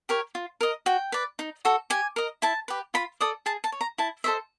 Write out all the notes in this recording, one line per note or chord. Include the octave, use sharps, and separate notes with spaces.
G4 A#4 C#5
F4
A#4 D#5
F#4 G5
B4 D5
D#4
F#4 A4
G4 G#5
A#4 D#5
E4 A5
G4 B4
F4 B5
A4 D5 D#6
G#4 A5
A5
C#5
A#5
E4 A5
A4 C5 D#5 E5